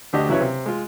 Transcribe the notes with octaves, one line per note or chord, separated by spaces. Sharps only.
D2 D4 F#4 G4 D#5
C#3 F#3 E4 B4 C#5
C3
G#3 F4